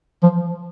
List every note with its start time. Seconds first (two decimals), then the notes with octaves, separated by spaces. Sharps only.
0.23 F3